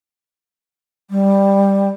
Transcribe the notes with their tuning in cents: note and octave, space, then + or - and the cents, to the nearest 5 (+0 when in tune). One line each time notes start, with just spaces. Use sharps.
G3 +5